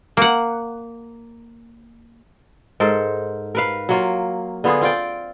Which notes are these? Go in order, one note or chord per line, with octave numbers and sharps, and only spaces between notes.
A#3 F#5
G#2 A4 A#4 C5
A#4 B4 F5
F#3 A#3 F4
D3 B3 F4 G#4
C4 F4 D5 G5